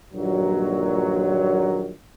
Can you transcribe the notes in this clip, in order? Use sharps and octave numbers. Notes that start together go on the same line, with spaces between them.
A#1 G2 A#2 D#3 F#3